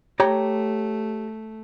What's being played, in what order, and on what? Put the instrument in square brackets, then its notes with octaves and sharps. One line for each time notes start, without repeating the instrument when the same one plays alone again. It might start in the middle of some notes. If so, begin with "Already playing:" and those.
[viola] A3 [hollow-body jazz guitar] G4 C#5 A#5